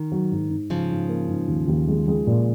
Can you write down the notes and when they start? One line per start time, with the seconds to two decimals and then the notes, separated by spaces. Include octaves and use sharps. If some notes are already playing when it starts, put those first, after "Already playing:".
Already playing: D#3
0.12 F#3
0.31 G#2
0.50 G#2
0.70 G#2 C#3 F3
0.91 G#2
1.09 A#3
1.29 G#2
1.48 D#2
1.68 D#2
1.88 G#3
2.08 G#3
2.27 A#2